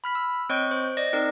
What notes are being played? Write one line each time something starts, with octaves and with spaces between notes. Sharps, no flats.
B5 F6 B6
E6
C4 C#5 D#5 C#6 G6 D7
C5
D5 D#5 A#6
C4 D#4 A#4 D5